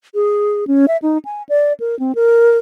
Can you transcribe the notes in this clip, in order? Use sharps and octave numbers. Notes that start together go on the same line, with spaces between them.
G#4
C#4
E5
D#4
G#5
D5
A#4
C4
A#4